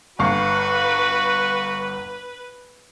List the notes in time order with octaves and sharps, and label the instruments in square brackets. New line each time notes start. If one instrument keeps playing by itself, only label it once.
[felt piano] G1 F5 C#6 [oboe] F#4 [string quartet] B4